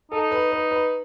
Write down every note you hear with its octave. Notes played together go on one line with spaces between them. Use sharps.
D#4 A4
B4
B4
B4